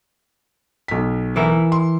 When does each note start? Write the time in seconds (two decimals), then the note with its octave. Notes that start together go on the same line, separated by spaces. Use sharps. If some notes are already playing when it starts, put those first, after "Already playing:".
0.88 B1 B6
1.36 E3 E4 A#4
1.72 C6